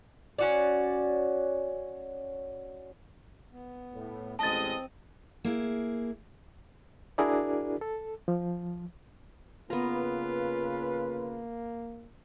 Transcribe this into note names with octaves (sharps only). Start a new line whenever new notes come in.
C#4 F#4 D5
B3
A2
A1 G#3 C4 D#5 A5 D#6 A6
A#3 E4 G#4
D4 E4 F#4 G#4 A#4 D5
A4
F3
C#3 A#3 B3 F4 B4 A#5